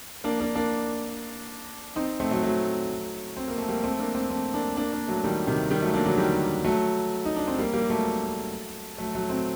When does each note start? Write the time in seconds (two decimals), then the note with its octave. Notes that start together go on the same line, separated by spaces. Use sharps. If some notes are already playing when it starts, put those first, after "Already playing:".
0.24 A#3 D4
0.40 A#3 D4
0.55 A#3 D4
1.96 C4 D#4
2.20 A3 C4
2.31 F#3 A3
2.43 F#3 A3
3.37 C4
3.48 A#3
3.58 A3
3.69 G3 A#3
3.84 A3 C4
3.99 A#3 D4
4.15 A3 C4
4.30 A3 C4
4.54 A#3 D4
4.77 A#3 D4
4.93 A#3 D4
5.08 F#3 A3
5.24 D#3 G3
5.47 C3 D#3
5.71 D#3 G3
5.82 F#3 A3
5.94 A#3 D4
6.06 D3 F#3
6.17 D#3 G3
6.64 F#3 A3
7.25 D#4
7.36 D4
7.48 C4
7.58 G3 A#3
7.73 G3 A#3
7.89 F#3 A3
8.98 F#3 A3
9.15 F#3 A3
9.30 A3 C4